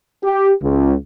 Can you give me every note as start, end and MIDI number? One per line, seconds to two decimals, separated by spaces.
0.23 0.50 67
0.62 0.92 37